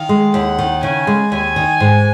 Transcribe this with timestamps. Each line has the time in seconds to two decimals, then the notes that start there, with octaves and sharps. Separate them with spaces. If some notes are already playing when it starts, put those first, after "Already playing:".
Already playing: D#3 F5
0.09 G#3
0.34 D#2 F#5
0.59 D#3
0.83 C#3 G#5
1.07 G#3
1.32 D#2 G#5
1.56 D#3
1.80 G#2